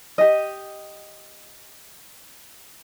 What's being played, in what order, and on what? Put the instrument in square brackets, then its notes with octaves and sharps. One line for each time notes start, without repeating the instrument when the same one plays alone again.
[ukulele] G4 D#5